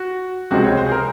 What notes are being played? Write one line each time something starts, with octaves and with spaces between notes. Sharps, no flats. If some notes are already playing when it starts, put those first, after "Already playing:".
Already playing: F#4
C#2 C3 F3 G#3 C4 F#4
C#5
C5
G#4
A#4